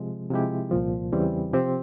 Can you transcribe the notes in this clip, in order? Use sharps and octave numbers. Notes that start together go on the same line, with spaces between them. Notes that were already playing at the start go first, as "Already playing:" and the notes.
Already playing: C3 F3 G#3
C3 F3 G#3 E4 G4
C2 A#2 F3
E2 C#3 E3 G3 C4
C3 F3 C4 G4